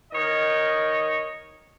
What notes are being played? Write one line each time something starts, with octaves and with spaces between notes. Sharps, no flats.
D#3 C#5 D#5